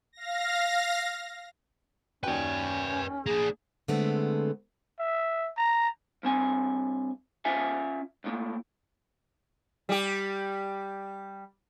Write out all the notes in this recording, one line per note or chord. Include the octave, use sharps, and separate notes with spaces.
F5 A#6
D#2 C#4 F#4 B4 D5 G5
A#3 D4 G#4
D3 G#3 A3 B3 C4
E5
A#5
G2 C4 G#5
C#4 F4 E5 F5 G#5
C2 A2 A#3
G3 G4